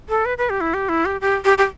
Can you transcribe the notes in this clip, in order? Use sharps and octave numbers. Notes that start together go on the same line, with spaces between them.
A4
B4
B4
G4
E4
G4
E4
G4
G4
G4
G4